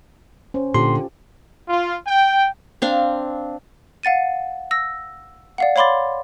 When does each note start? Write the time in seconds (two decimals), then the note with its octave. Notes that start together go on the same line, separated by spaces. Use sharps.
0.54 C#4 C5
0.74 A#2 D3 F4 G4 C6
1.69 F4
2.05 G5
2.82 C4 D4 F5
4.03 F5 F#5 A6 D#7
4.71 E6 A#6
5.58 D5 F5 F#5
5.76 C#5 F5 B5 C6 D6 A6